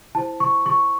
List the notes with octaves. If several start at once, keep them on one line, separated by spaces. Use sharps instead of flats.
E4 C5 A5
C#6
C#6